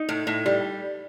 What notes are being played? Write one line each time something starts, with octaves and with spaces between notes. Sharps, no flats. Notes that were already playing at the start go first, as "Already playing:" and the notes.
Already playing: D#4
A2
A2
G3